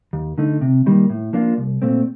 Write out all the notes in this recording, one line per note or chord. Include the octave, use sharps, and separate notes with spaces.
D#2
D3 A3 D#4
C3
D#3 G3 A#3
A2
F3 A#3 D4 F4
C2
A#2 A3 C4